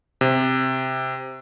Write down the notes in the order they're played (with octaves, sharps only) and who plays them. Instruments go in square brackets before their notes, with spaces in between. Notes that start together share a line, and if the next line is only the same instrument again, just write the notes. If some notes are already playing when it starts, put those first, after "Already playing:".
[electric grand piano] C3